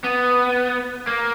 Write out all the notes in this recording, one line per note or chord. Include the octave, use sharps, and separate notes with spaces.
B3
A#3